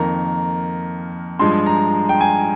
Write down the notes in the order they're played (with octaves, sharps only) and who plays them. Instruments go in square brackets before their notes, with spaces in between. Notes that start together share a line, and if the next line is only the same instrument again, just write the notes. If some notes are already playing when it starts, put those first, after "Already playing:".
Already playing: [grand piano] F2 D#3 A#3 A#5
G2 F3 G#3 C6
A#5
G5
G#5